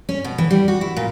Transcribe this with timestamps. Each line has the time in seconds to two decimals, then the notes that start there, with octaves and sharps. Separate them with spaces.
0.09 C#4
0.24 B2
0.38 E3
0.51 G3
0.68 F#4
0.81 E4
0.96 A#2